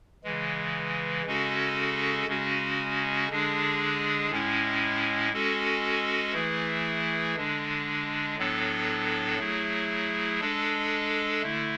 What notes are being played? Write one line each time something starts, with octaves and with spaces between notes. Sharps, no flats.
C#3 E3 G#3
C#3 G#3 C#4 F#4 A4
C#3 G#3 C#4 F#4
D3 G#3 D4 G#4
A2 G#3 C#4 E4
G#3 C#4 F#4 A4
E3 A3 E4 G#4
D3 G#3 D4
A2 F#3 B3 D4 A4
F#3 A3 E4 G#4
G#3 D4 A4
D3 A3 E4